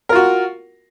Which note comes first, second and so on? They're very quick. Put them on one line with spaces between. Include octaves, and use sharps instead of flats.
A#4 F4 F#4